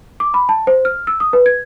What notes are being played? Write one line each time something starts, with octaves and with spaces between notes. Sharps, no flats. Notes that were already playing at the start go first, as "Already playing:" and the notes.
D6
B5
A5
C5
F6
E6
D#6
B4
G#6